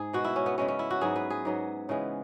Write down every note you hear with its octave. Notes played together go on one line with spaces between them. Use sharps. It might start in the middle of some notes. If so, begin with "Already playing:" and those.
Already playing: G#2 G#4
B2 G#3 B3 F#4
E4
C#4
B3
C#3 G#3 B3 C#4
C#4
E4
F#4
G#2 F#3 B3 G#4
B4
G#4
G#2 F#3 B3
C#3 E3 G#3 B3